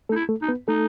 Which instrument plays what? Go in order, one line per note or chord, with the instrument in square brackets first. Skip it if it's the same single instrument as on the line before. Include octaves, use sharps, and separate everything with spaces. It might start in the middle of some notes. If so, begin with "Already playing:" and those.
[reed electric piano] A3 A4 [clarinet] D#4
[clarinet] E4
[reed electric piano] A3 A4
[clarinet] D#4
[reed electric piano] B3 B4
[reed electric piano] A3 A4 [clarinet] D#4